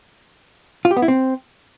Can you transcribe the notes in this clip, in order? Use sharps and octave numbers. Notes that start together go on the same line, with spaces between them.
F4
G4
B3
E4
C4